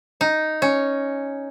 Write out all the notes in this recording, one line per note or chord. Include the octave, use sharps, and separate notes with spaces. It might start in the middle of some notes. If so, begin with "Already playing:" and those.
D#4
C#4